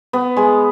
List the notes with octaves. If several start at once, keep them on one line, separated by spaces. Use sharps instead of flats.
B3
G#3